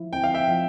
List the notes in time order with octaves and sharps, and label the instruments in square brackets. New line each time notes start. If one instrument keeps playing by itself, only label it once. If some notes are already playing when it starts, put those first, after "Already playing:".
Already playing: [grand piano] F3 E4
[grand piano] C4 [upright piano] G5
[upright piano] F5
E5 G5
[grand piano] F3